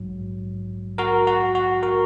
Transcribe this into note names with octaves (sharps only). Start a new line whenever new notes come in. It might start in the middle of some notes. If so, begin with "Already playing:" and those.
Already playing: A#1 G#2 F#3
F#4 A#4
F#4
F#4
F#4 A#4